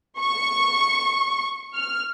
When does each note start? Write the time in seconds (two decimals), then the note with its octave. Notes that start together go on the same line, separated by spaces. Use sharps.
0.19 C#6
1.74 F6